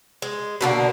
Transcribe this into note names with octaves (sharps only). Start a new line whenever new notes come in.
G#3
B2 D3 A#3